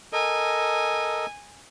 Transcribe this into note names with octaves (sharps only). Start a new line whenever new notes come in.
A4 A#4 D#5 G#5